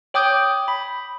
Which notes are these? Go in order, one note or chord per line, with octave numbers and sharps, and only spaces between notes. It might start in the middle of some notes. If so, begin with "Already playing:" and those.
C#5 G5 D6 D#6 G6
B5